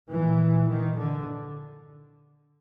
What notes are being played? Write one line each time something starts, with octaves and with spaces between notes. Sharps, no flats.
A#2 E3
D#3
D3